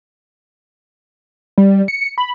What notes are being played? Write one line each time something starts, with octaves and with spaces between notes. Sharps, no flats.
G3
C#7
B5